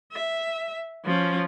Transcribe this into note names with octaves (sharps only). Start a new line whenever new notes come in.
E5
F3 C#4